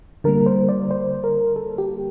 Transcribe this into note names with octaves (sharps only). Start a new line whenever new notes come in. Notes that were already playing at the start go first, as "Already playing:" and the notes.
D3 G3 A#3 A#4
C5
D5
C5
A#4
A4
G4